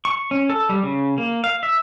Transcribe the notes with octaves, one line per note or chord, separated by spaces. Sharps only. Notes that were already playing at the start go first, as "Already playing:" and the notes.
C#6
C#4
A4
G3
C#3
A#3
F5
E5